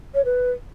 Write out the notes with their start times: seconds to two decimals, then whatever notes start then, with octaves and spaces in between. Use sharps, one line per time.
0.14 C#5
0.24 B4